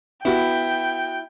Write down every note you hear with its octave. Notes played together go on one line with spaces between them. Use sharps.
B3 E4 F#4 G5